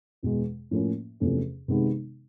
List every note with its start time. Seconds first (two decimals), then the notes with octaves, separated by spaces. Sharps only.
0.23 E2 B2 G#3
0.71 A2 F3 A#3 C#4
1.20 E2 C3 F3 A3 C#4
1.68 C3 D#3 G#3 B3 D#4